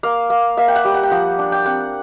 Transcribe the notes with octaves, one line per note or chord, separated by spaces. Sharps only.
A#3 F5
A#3
A#3 E5
G5
F#5
G3
F#5
G5
F3 F#5
D4
G5
C4 F#5